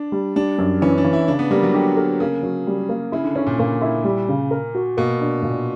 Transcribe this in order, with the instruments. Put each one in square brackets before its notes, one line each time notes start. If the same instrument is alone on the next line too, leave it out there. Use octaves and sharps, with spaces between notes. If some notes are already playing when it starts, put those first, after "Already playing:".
Already playing: [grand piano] D4
[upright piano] G3
[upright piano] G3 [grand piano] D4
[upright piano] F#2
[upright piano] E3 [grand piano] C#4
[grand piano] D4
[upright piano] E3
[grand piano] E4
[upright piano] C#3 [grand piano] D4
[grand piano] B3
[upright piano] G3 [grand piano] A#3
[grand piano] F#3
[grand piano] D3 [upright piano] G4
[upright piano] A#4
[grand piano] C#3 [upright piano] A#3
[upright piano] F#3
G3
A#3
[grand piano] C#3 [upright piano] E4
[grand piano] D3
[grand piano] C#3 [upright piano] C#4
[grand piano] A#2
[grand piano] A#2 [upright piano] A#3
[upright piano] E4
G3
C#3
A#4
F#4
[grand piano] B2 [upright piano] A#3
[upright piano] D4
A#2